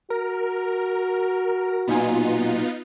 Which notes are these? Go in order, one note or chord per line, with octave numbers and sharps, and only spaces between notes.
F#4 A#4
B1 A#2 B3 D#4 F4 G#5